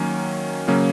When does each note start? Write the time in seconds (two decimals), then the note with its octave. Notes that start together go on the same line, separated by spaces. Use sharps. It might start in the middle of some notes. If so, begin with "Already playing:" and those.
Already playing: D#3 F#3 A#3 C#4
0.68 C#3 F#3 A#3 C#4